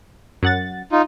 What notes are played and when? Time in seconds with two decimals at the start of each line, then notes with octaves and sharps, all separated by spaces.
0.43 F#2 F#5 A6
0.92 D#4 F4